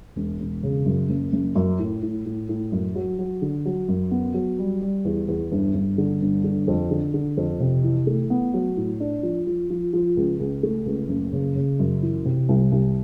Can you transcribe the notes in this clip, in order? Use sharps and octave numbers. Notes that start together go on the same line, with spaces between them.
E1
E1
C#3
F#2
F#1
F#1
F#2
A2
A2
A2
A2
F#2
F#3
F#3
D3
F#3
F#2
B3
F#3
G3
G3
E2
E2
G1
G1
D3
G1
D3
F2
D3
D3
F2
C3
E3
A3
B3
F#3
A2
D4
F3
F3
F3
F3
C#2
C#2
A3
C#2
F#1
C#3
C#3
F#2
E3
C3
C2
C2